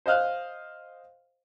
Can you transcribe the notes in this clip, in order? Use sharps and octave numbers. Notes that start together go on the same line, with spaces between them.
C5 D#5 F5 F6 F#6